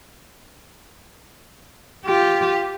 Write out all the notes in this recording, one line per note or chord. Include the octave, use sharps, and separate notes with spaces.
F4 G4